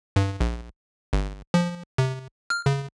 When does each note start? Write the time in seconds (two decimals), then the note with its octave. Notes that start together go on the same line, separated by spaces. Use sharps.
0.16 G2
0.41 A#1
1.13 G1
1.54 F3
1.98 C3
2.50 F6
2.66 C#3